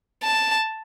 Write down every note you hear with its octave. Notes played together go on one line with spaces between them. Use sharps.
A5